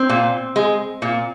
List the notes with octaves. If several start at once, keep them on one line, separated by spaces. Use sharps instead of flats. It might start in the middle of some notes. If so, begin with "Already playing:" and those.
Already playing: C4
A#2
G#3
A#2